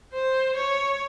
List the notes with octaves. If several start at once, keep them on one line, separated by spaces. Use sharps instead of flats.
C5
C#5